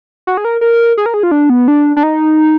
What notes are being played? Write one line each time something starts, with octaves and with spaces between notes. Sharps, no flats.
F#4
G#4
A#4
A#4
G#4
A#4
G#4
F4
D4
B3
D4
D4
D#4